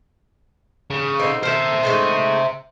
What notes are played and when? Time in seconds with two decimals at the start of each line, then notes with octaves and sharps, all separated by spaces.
0.90 C#3
1.19 D3 C4 D#4
1.43 D#3 A4 C5 E5
1.83 G#3 A3 D#4